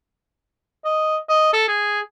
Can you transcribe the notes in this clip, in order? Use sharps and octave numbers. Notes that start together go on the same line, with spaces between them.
D#5
D#5
A4
G#4